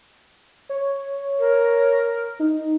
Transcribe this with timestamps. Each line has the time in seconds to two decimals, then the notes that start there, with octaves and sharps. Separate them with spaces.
0.69 C#5
1.39 A#4
2.40 D#4